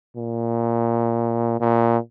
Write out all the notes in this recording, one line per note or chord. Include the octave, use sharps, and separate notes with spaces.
A#2
A#2